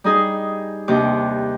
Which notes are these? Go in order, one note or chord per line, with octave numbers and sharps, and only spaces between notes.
G3 D#4 G#4
D#2 C3 D4 D6